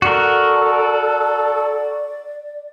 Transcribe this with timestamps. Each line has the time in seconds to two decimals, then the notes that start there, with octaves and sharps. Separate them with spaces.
0.02 F#4 A4 A#4 D5